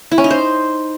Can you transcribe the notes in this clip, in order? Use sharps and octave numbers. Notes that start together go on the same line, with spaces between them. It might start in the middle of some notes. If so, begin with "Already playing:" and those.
E4
C#4
D#4
C5